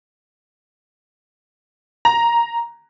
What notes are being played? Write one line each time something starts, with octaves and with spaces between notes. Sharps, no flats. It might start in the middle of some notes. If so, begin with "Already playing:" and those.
A#5